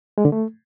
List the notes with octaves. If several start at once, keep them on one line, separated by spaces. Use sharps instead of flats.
G#3
D3
A3